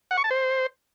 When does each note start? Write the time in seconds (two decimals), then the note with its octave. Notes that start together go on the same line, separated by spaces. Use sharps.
0.11 F#5
0.17 C#6
0.24 A5
0.31 C5